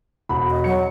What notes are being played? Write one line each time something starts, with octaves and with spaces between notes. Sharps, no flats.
E1 F#4 B5
D#5
F#3 C#7